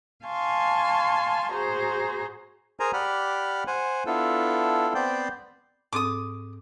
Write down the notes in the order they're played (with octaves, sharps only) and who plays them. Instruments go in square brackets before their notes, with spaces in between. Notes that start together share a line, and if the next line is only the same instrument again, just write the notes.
[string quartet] F5 G#5 A5 C6 C#6
F#4 G#4 C5 A#5
[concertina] G#4 A#4 C5 G#5 A#5
G4 D5 F#5 B5 F6
C5 F#5 G#5
B3 D4 E4 F4 A4
B3 C4 C5 D5 G5
[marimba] G#2 C4 A4 [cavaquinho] D6 D#6